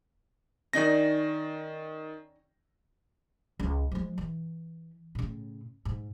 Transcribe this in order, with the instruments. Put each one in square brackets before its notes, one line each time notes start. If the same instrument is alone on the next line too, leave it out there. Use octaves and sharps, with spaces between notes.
[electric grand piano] D#3 A#6 [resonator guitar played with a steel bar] C#4 D#4 D5
[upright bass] C#2
F3 G#3
E3
A2 C#3
G#2